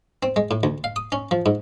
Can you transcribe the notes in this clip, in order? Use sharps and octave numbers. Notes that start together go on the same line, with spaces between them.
C4
G#3
A2
D2
F5
D#6
C#4
F3
G#2